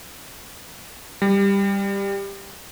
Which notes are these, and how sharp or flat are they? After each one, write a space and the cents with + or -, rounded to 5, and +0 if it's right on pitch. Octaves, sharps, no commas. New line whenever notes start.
G3 +15